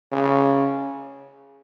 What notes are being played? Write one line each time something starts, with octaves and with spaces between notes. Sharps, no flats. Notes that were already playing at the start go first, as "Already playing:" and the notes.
C#3